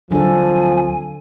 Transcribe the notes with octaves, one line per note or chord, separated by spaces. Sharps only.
D2 D3 F3 F#3 C4 D4 A4 G#5